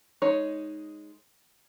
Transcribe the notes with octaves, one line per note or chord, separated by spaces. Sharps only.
G#3 D#4 C#5